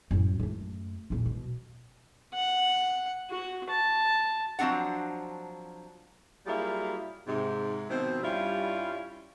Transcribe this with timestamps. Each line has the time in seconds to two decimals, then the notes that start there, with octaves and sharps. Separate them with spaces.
0.11 F#2 A2
0.40 F#2 A3
1.10 E2 A#2
1.26 B2
2.34 F#5
3.30 F#4
3.69 A5
4.59 F3 F#3 C4 D4 F#5
6.47 F#3 G3 A#3 E4 F4 G#4
7.27 G#2 C3
7.89 B2 D#3 F3 C4
8.23 G2 G3 C#4 E4 F4